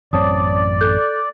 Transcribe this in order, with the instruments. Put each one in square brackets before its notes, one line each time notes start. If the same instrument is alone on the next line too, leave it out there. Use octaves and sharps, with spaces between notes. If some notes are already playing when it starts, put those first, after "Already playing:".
[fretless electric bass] A1 F#2 C4 [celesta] C#5 A5 D#6 [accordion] D5
[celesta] A4 F#6 G6